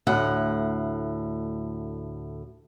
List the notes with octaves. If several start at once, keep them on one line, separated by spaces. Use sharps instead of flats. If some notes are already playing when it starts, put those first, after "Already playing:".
D2 A2 F#5